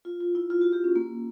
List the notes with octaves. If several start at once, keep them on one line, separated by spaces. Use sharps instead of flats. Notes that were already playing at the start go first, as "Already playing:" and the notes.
F4
F4
E4
F4
F#4
G4
C#4
A#3